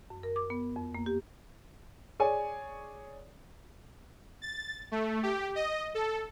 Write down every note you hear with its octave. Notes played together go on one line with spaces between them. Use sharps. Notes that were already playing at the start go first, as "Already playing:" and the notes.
F#2
A#4
D6
B3
F2
A#3
G4
G#4 C#5 D5 G#5
A6
A3
G4
D#5
A4